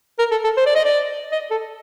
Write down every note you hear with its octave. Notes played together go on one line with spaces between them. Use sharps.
A#4
A4
A4
C5
D5
D#5
D5
D#5
A4